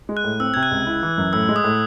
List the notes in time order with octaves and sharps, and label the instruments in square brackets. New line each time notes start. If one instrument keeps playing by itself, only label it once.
[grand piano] G#3
[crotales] F#6
[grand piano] A2
[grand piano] C4 [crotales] E6
[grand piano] C3 [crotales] G#6
[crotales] F#6
[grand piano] C#2
E4
E3
F#2
[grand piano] A2 [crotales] E6
[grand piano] G#3
[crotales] D#6
[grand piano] A2